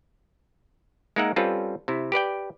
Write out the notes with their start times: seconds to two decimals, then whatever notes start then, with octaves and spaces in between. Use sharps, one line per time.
1.16 G#3 A#3 D#4 A#4 E5 F#5
1.36 G3 C4 C#4 F4 A4 B4
1.88 C3 E4
2.12 G4 B4 D5 G5